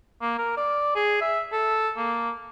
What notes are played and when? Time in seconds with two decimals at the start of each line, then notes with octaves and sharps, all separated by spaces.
0.21 A#3
0.38 A#4
0.57 D5
0.95 G#4
1.21 E5
1.52 A4
1.97 A#3